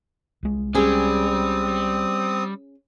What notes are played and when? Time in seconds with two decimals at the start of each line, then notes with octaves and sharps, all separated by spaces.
0.43 C2 G#3
0.75 G3 C4 C#4 G#4 D#6